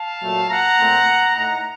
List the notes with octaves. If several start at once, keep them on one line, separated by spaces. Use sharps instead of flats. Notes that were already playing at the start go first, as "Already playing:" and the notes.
Already playing: F5 A5
A#2 F#3 A3
F#5 A#5
A#2 A3 C4
A2 A3 D#4 F#5 A#5